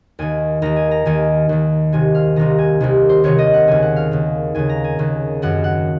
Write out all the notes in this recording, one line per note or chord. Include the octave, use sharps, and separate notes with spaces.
D#2 D#3 G#5
D#2 D#3 A#5
G#5
A#5
D#2 D#3 G#5
D#2 D#3
C2 C3 D#3 G#5
F5
C2 C3 D#3 A#5
G#5
C2 C3 D#3
C5
C2 C3 D#3 C#5
D#5
F#5
D#2 C#3 G#5
F#5
F5
D#2 C#3
D#2 C#3 G#5
A#5
G#5
D#2 C#3
F#2 D#3 F#5
F#5